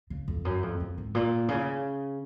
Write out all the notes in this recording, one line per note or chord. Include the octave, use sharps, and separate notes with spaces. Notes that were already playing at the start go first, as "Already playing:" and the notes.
C#3
F2
F#2
F2
F2
G#2
A#2
C#3